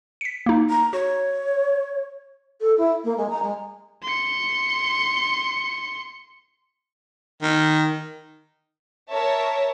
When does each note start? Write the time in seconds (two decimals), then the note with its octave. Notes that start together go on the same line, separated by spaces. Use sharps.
0.21 B6 C#7
0.46 A#3 D#4
0.70 A#5
0.93 F#4 C#5
2.61 A4
2.77 E4
3.04 A#3
3.17 G#3
3.29 A#5
3.42 G#3
4.03 C6 C#7
7.42 D#3
9.11 A#4 C#5 E5 A5